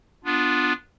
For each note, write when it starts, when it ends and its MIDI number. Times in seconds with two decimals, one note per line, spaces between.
0.25 0.73 59
0.25 0.73 62
0.25 0.73 65